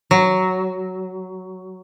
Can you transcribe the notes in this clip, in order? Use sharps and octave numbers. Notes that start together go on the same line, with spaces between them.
F#3